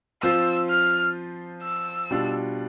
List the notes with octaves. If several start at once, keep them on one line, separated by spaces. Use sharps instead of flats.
F3 C4 F4 C5 E6
F6
E6
B2 G3 D4 F4